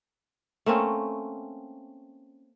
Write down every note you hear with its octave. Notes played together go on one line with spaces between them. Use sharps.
A3 A#3 C4 C#4